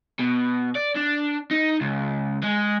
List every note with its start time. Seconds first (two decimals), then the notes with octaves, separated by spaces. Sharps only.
0.19 B2
0.76 D5
0.96 D4
1.51 D#4
1.81 C#2
2.43 G#3